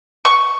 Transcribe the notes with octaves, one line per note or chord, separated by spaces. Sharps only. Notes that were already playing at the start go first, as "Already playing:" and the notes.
C#6